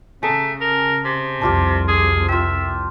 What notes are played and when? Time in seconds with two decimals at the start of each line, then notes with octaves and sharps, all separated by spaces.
0.23 C#3 A3 G#4 A5 A#5
0.61 A#4
1.05 C3
1.41 C2 F2 D4 F4 G4
1.88 G#4
2.29 F4 E5 G5